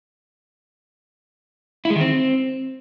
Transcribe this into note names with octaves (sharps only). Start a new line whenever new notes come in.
E4
G#3
D#3
C4